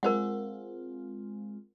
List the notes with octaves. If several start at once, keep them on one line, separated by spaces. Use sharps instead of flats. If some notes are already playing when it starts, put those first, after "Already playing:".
G#3 C4 F4 A#4 C5 F#5